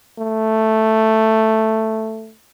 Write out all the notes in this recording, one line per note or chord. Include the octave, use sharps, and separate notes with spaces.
A3